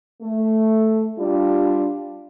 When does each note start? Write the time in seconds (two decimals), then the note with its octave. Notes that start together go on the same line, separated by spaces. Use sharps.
0.22 A3
1.17 G3 D4 F4